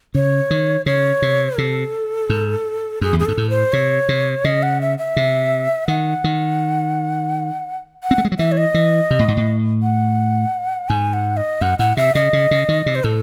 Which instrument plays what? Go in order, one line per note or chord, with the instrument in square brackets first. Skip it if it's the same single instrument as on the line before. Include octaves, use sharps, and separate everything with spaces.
[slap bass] C#3 [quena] C#5
[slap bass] D#3
[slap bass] C#3 [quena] C#5
[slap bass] C3
[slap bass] C3 [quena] A4
[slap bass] G#2
[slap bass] F#2 [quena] G#4
[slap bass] E2
[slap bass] F#2 [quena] G#4
[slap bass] G#2 [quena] A4
[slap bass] A2
[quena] C5
[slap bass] C3 [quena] C#5
[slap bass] C3
[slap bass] C#3 [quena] D#5
[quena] F#5
E5
E5
[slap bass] C3
[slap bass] D#3 [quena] F#5
[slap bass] D#3
[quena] F#5
[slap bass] C4
A3
G#3
F#3
[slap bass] E3 [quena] E5
[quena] C#5
D#5
[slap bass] E3
C3
A2
G#2
A2
[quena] F#5
[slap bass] G#2 [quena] G#5
[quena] F#5
D#5
[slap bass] F#2 [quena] F#5
[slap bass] A2 [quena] F#5
[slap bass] C3 [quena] E5
[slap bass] C#3 [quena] D#5
[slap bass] C#3
C#3
D#3
C3
[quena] C5
[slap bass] A2 [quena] A4